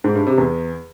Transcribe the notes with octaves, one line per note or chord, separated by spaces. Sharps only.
G#2
G2
C3
E2